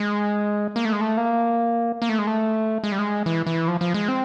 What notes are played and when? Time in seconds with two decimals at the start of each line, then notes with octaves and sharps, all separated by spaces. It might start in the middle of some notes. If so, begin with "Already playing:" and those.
Already playing: G#3
0.76 A#3
0.85 A3
0.92 G#3
1.01 A3
1.17 A#3
2.02 A#3
2.09 A3
2.19 G#3
2.27 A3
2.84 G#3
2.92 G3
2.99 G#3
3.26 E3
3.46 E3
3.68 F3
3.81 F3
3.94 G#3
4.08 C4